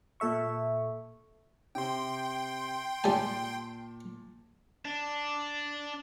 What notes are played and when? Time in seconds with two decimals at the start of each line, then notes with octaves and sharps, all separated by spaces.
0.20 A#2 A4 E5 C#6
1.75 C3 G5 C6
3.04 A#2 G3 G#5 A5
4.85 D4